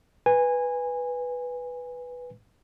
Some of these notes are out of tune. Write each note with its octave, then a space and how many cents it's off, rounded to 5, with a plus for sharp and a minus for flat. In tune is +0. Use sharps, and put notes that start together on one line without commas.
B4 +0 G#5 -20